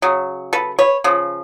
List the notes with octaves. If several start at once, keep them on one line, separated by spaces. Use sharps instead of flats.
C#3 F#3
A4 B4
B4 C#5
C#3 F3